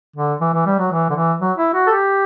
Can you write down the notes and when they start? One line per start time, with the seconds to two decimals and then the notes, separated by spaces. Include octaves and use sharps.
0.16 D3
0.41 E3
0.54 E3
0.66 G3
0.79 F#3
0.91 E3
1.10 D3
1.15 E3
1.41 F#3
1.58 E4
1.74 F#4
1.87 A4
1.90 G4